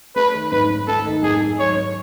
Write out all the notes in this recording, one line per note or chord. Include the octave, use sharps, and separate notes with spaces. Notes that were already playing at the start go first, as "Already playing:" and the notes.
A3 B4
D#3
G#2 B4
G#2
A3 A4
D#3
G#2 G#4
G#2
F#3 C#5
G#2